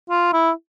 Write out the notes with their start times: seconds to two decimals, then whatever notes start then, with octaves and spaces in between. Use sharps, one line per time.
0.10 F4
0.33 E4